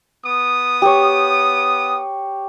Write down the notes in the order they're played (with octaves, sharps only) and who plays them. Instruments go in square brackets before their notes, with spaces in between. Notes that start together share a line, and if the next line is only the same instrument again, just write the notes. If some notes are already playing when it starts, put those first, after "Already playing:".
[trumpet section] B3 D#6
[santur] G4 C#5